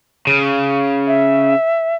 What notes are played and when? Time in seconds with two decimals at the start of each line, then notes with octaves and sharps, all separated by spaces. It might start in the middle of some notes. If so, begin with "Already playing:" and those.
0.27 C#3
1.07 E5